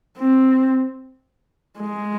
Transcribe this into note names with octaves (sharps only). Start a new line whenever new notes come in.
C4
G#3